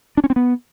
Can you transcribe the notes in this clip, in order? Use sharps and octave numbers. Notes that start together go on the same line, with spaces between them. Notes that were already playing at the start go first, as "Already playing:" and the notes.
D4
C#4
C4
B3